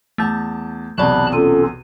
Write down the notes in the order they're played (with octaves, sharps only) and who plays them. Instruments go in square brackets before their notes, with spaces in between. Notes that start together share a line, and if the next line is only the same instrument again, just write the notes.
[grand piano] E2 A5 [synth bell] A3 G6
[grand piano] B1 E2 C3 [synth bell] F#3 D5 [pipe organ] A5 B5 F#6
[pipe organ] C#4 F4 A4 [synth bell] D#7